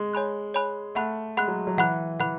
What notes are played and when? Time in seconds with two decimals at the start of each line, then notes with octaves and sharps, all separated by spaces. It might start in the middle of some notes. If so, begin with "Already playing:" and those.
Already playing: G#3
0.13 C#5 G#5 B5 F#6
0.54 C#5 G#5 B5 F#6
0.95 A3 F#5 B5 F#6
1.37 G#3 F#5 B5 F#6
1.48 F#3
1.67 F#3
1.78 E3 F#5 B5 F#6
2.20 E3 F#5 B5 F#6